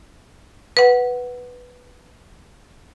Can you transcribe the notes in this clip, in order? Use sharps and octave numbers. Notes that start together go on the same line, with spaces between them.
B4 F#5